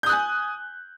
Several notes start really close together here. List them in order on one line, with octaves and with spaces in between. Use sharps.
G6 D#6 F#6 G#5